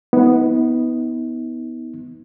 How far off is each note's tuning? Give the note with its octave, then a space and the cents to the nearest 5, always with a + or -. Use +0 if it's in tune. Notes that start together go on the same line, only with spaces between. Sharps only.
B3 +0 D#4 +45